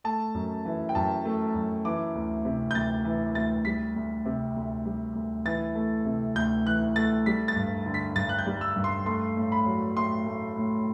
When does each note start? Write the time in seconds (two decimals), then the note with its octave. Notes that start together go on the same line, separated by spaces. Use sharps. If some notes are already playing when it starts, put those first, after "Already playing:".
0.04 A3 A5
0.35 F#2
0.65 E3
0.89 G5
0.95 F#2 A5
1.25 A3
1.55 F#2
1.85 E3 D6
2.15 D2
2.45 C3
2.71 G6
2.75 D2 A6
3.05 E3
3.35 D2 A6
3.65 G3 B6
3.96 D2
4.25 C3
4.56 D2
4.85 G3
5.15 D2
5.45 E3 A6
5.75 A3
6.05 C3
6.35 D2 G6
6.66 E3 F#6
6.96 A3 A6
7.26 G3 B6
7.48 A6
7.56 G2
7.86 D3
7.94 B6
8.16 G2 A6
8.29 F#6
8.39 G6
8.46 G3
8.61 E6
8.76 G2
8.84 C6
9.06 A3 C6
9.37 A2
9.52 B5
9.66 F#3
9.97 A2 C6
10.26 A3
10.57 A2